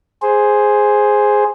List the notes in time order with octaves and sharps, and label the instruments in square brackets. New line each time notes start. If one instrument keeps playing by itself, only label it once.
[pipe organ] G#4 C5